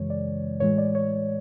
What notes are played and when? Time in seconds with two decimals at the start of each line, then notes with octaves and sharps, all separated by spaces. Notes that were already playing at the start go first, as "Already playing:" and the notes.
Already playing: F#2 C#3 E3 G#3 C#5
0.10 D5
0.60 A2 E3 G#3 C#5
0.78 D5
0.95 C#5